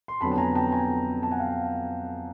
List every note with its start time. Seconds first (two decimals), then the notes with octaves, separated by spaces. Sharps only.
0.08 C6
0.21 F2 D3 F#3 B3 A5 B5
0.32 A5
0.38 G#5 A#5
0.55 G5 A5
0.72 G#5 A#5
1.23 G5 A5
1.32 F#5 G#5
1.39 F5 G5